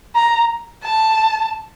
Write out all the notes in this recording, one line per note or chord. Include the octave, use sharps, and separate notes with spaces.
A#5
A5